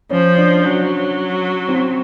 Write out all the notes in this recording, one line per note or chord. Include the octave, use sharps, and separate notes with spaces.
F3 C#4
D4
D4
F#3 C#4
C4